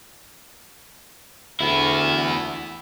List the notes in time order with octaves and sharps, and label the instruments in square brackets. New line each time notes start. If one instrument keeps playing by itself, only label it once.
[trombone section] D2 [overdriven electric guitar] B3 E4